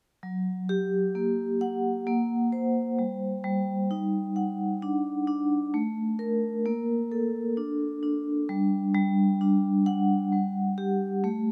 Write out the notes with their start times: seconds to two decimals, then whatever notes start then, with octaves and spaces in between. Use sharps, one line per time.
0.23 F#3
0.69 G4
1.15 A#3
1.61 F#5
2.07 A#3
2.52 C5
2.99 G3
3.44 G3
3.91 D#4
4.36 F#5
4.82 D4
5.27 D4
5.74 A3
6.19 A#4
6.66 A#3
7.12 A4
7.57 D4
8.03 D4
8.49 G3
8.95 G3
9.41 D4
9.86 F#5
10.32 G3
10.78 G4
11.24 A3